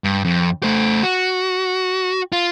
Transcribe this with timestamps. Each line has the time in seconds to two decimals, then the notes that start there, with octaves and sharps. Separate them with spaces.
0.04 G2
0.25 F2
0.63 A3 C5
1.03 F#4
2.33 F4